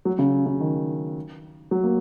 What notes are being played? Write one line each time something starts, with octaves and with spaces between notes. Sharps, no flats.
F#3
C#3
C#3
D#3
F#3
A#3